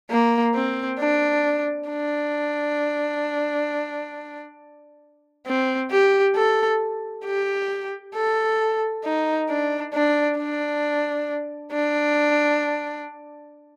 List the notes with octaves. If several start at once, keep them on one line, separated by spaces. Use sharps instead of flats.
A#3
C4
D4
D4
C4
G4
A4
G4
A4
D#4
D4
D4
D4
D4